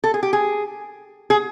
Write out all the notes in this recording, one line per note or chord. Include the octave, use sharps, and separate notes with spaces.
A4
G#4
G4
G#4
G#4